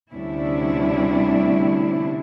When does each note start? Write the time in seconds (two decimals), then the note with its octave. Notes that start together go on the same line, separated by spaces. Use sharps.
0.12 D2 C3 G3 C#4 D4 E4